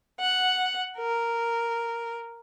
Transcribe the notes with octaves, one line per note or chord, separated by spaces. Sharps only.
F#5
A#4